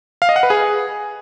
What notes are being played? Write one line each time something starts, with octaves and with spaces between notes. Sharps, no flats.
F5
D#5
F#5
B4
G#4